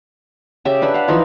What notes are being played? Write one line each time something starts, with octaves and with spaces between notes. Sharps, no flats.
C#3 G4 E5 G5
D4 B4 B5
F5 F#5
E3 F3 D#4 F4